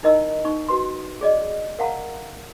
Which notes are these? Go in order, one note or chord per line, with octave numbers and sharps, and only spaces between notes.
D#4 E4 A#4 D#5 A#5 E6
D#4 C#6
F#4 B4 C6
G#4 D5 D#5
A#4 F5 F#5 A5 A#5